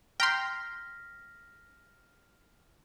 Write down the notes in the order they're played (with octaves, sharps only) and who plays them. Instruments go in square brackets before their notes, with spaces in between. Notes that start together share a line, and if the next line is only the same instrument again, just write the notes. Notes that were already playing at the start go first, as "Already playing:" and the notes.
[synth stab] G5 A#5 C6 [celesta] F6 A#6 B6